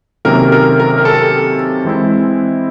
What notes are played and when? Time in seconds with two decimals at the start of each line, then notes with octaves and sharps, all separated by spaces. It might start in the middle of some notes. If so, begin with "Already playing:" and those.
0.25 C3 D#3 F#3 A#3 C#4 A#4
0.52 A#4
0.80 A#4
0.98 A#4
1.05 A4
1.85 E3 G#3 C4 E4